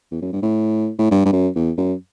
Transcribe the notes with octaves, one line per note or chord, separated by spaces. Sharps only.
E2
F#2
G2
A2
A2
G2
G2
F#2
E2
F#2